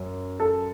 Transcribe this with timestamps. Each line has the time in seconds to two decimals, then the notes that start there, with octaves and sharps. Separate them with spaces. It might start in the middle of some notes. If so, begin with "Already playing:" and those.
Already playing: F#2
0.40 A4